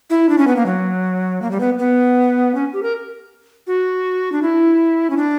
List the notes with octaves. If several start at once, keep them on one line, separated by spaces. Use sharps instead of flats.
E4
D4
C#4
B3
A#3
F#3
A#3
G3
B3
B3
C#4
G4
A#4
F#4
D4
E4
C#4
D4